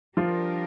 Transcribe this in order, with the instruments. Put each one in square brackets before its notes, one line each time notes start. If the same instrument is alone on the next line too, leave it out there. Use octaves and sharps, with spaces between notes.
[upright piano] F3 F4 [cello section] G3 D4 G4 A#4